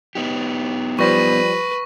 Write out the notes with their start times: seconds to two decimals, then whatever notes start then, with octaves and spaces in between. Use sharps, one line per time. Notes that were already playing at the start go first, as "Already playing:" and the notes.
0.15 B3 D#4 G4
0.99 F3 G3 B4 C5 C#6 A#6